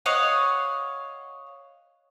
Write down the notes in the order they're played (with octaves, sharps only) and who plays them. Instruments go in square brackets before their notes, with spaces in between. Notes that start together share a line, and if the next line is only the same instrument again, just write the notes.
[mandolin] C#5 D#5 F5 F#5